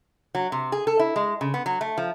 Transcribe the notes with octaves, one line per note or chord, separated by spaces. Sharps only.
F#3
C3
G#4
A4
E4
G#3
C#3
B3
F#3
A3
F3